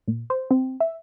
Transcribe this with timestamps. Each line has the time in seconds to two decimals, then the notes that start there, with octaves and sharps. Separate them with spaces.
0.08 A#2
0.30 C5
0.51 C4
0.80 E5